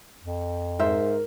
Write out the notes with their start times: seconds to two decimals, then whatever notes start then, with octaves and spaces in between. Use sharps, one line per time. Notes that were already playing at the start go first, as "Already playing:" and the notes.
0.22 F2
0.79 G#2 A#4 C5 E5